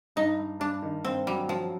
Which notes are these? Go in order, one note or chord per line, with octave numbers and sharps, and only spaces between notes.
G2 D#4
G2
G2 D4
D#3
G2 C4
F#3 G3
F3 F#3